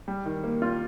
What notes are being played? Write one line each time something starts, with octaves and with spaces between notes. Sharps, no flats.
G3
D#3
A#3
F4